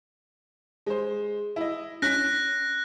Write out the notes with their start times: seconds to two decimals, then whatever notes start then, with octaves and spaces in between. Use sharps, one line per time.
0.86 G#3 C5
1.56 E4 D#5
2.02 C#4 F#6 A#6 B6